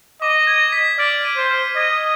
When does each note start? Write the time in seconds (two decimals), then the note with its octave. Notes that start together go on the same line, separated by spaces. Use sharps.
0.21 D#5 D6
0.47 G#6
0.72 B6
0.98 D5 F6
1.25 D#7
1.37 C5
1.51 F6
1.76 D#5 G#6